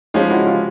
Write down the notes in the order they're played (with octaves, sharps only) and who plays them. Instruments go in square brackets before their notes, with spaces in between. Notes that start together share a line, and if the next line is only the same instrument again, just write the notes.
[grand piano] F3 G#3 C#4 [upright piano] D#4 F4
[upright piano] E4 F#4
F4 G4